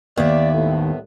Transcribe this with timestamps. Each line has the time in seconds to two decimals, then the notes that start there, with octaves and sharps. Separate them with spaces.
0.17 D#2 B3 D5 E5
0.54 C2 A2